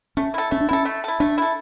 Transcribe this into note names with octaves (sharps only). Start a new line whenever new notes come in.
A3 C#4
E4 A4
A3 C#4
D4
C#4 E4 A4
A3
E4 A4
A3 D4
E4 A4